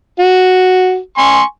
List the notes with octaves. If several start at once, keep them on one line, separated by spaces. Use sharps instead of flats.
F#4
G#5 C6 C#6